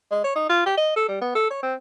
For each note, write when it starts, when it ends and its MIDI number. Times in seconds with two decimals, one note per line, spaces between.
0.11 0.23 56
0.24 0.34 73
0.36 0.47 63
0.50 0.64 65
0.66 0.74 67
0.78 0.92 75
0.96 1.06 69
1.08 1.21 55
1.22 1.32 59
1.35 1.49 69
1.51 1.58 73
1.63 1.75 60